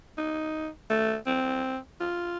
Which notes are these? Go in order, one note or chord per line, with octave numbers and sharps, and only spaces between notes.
D#4
A3
C4
F4